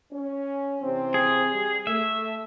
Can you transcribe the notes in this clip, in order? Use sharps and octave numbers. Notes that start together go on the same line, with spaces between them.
C#4
C3 E3 C4
G#4
G3
A3 E5